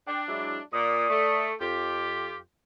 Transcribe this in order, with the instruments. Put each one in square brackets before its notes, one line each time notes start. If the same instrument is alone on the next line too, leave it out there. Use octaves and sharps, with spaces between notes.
[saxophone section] D4 [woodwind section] G5 D6
[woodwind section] F#3 G#3 E4
[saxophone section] A#2 [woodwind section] D5 D#6
[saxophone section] A3
[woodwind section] F2 [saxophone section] F4 G4